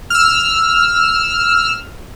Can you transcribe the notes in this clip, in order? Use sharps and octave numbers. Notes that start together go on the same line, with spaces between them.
E6 F6